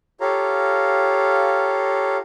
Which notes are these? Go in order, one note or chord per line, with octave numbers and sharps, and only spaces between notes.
F4 G4 A4 C#5 F5 A#5